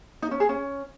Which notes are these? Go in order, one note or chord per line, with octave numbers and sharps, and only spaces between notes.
D#4
C#4
G#4
C#4